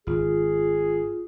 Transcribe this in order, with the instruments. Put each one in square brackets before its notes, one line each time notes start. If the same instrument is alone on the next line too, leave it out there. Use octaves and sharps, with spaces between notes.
[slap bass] G#1 [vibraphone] F4 [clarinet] G#4